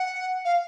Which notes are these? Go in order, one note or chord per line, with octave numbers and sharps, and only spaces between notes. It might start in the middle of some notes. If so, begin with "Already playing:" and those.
Already playing: F#5
F5